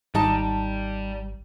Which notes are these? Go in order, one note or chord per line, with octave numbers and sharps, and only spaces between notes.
G#1 G3 D#4 A5